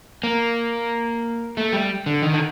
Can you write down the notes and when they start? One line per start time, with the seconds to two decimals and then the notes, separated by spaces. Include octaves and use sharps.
0.23 A#3
1.57 A3
1.73 G3
2.06 D3
2.23 D#3
2.34 D3